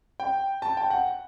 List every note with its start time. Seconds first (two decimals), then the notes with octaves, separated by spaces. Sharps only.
0.20 G5
0.62 A5
0.77 G5
0.90 F#5